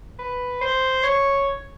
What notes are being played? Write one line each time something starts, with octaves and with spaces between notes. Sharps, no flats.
B4
C5
C#5